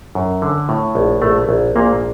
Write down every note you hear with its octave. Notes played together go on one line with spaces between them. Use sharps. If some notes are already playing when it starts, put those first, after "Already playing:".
F#2
D3
A2
A#1
A#1 A3
A#1
A#1 A#2 A#3